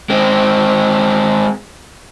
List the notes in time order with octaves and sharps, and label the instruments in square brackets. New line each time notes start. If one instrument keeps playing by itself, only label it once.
[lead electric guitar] G#3 C4